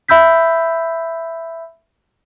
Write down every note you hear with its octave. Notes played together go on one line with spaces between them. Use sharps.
E5 B5 E6 G6 B6